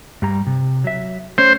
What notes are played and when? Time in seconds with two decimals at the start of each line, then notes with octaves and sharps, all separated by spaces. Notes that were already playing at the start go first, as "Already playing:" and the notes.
0.22 G2 G3 A#5
0.47 C3
0.84 F#3 E5
1.38 A3 C#4 C5 C#5